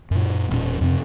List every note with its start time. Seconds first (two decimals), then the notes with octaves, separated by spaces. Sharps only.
0.11 F#2 A#2
0.50 E1 A#2 C#4
0.81 F2 C3 C4